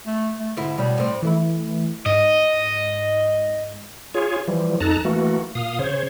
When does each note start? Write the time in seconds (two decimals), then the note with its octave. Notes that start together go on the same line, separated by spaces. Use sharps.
0.06 A3
0.39 A3
0.57 G#2 D3 C4 E4
0.78 B2 G3 C#4
0.98 A2 C4
1.22 E3 A3 E4
2.06 G#2 D#5
4.14 F4 G#4 C#5
4.48 E3 F3 G3
4.80 F2 D#4 A4 A5 A#5 F#6
5.05 E3 A3 A#3 F#4
5.55 A#2 F5 D#6
5.79 C#3 C5 C#5